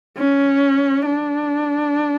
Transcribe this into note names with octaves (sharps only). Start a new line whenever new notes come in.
C#4
D4